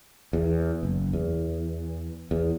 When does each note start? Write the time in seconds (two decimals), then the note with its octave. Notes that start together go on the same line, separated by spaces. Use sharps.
0.33 E2
0.83 F#1
1.13 E2
2.31 E2